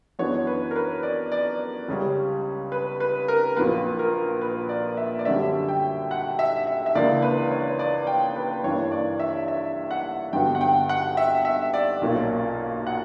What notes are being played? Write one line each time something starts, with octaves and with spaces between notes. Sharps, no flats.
F#2 E3 B3 D4 C#5
B4
A#4
B4
D5
D5
C#2 C#3 G3 C#4
B4
B4
A#4
A#1 A#2 F#3 A#3 B4
A#4
B4
D5
E5
D5
F#2 D3 G3 C#4 E5
G5
F#5
E5
E5
E5
C#2 C#3 E3 A#3 D4 D5
B4
C#5
D5
G5
B4
G2 E3 A#3 D4 C#5
D5
E5
E5
F#5
G2 D3 F#3 B3 G5
F#5
G5
F#5
E5
E5
D5
B1 A#2 A#3 C#4
F#5